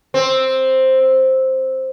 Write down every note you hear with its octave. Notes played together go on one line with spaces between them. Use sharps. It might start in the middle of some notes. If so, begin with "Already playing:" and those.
C4